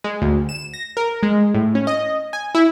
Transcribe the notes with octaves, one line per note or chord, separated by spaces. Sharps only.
G#3
D2
E7
A#6
A#4
G#3
A2
C#4
D#5
G#5
E4